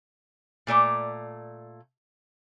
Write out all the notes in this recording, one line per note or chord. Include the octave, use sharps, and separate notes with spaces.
A#2 A3 D5 A#5